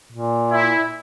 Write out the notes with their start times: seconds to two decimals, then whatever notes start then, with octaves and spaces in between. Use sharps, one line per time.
0.13 A#2
0.52 E4